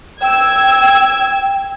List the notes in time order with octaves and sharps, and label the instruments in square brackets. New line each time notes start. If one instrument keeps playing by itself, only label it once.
[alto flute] G5 [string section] E6 G#6